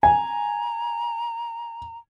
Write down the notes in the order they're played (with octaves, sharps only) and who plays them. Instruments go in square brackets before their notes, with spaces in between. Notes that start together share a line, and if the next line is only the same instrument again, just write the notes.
[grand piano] G#5 [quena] A#5